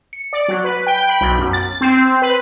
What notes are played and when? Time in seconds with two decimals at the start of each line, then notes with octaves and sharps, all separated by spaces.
0.13 C#7
0.33 D5
0.48 F#3
0.64 B4
0.87 G5
1.09 B5
1.21 B1
1.39 F#2
1.53 A6
1.81 C4
2.22 B4